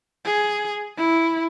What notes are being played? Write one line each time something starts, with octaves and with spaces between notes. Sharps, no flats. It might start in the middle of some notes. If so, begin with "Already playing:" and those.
G#4
E4